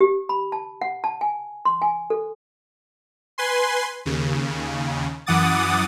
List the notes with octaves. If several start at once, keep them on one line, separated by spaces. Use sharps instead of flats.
G4
B5
A5
F#5
A5
G#5
C6
G#5
A4
B4 G#5 C6
D#2 C#3
F#2 E3 F#5 D6 D#6 A6